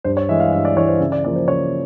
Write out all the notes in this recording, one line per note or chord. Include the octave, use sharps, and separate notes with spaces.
G2 C5
C#5
E3 G#3 E5
F5
G2 E5
D5
E3 G#3 C#5
C5
C#3 E5
D5
F3 A#3 D5
C5
C#3 C#5